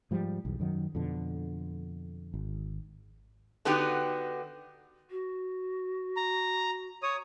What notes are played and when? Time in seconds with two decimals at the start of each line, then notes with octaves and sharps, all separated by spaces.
0.11 G#2 F3 G3
0.45 B1 E2
0.60 F#2 D#3 F#3
0.95 F2 B2 D3
2.34 G#1
3.65 D3 B3 D#4 F#4 G4
5.11 F#4
6.17 A#5
7.03 C#5 D#6